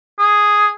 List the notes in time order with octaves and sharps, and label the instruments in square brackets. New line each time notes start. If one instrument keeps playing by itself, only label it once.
[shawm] G#4